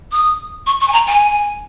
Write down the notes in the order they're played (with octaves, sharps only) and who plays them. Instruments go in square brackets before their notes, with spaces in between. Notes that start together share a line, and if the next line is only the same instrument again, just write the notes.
[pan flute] D#6
C#6
C#6
G#5
A#5
G#5